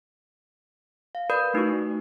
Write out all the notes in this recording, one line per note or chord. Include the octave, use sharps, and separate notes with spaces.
F5
A#4 B4 D5 B5 D#6 G6
A3 D#4 E4 F#4 C#6